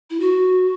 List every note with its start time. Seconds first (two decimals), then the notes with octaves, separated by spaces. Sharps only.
0.10 E4
0.20 F#4